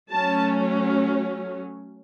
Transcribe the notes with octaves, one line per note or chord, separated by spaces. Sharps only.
F#3 A3 C#4 A5